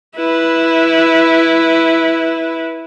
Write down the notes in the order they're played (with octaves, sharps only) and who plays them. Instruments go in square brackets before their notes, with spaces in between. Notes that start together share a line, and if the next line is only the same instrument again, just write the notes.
[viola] E4 B4